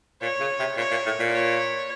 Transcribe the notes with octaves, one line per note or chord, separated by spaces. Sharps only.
A#2 C#5
C#3
C3
A#2 C#5
A#2
A2
A#2
C#5